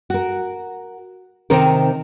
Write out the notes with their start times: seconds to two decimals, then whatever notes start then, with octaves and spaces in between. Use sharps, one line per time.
0.10 F#4 A#4
1.50 C3 D#3 C4 D#4 A#4